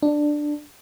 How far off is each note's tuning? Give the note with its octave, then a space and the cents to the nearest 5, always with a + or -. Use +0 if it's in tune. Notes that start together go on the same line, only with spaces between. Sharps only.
D4 +10